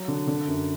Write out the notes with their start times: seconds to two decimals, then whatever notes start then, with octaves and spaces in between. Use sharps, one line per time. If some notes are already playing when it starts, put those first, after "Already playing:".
Already playing: F#3
0.08 D3
0.27 D3
0.47 F#2